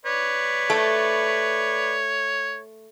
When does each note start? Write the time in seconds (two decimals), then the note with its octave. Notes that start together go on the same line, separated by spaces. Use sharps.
0.05 B4 C#5 D5
0.70 A3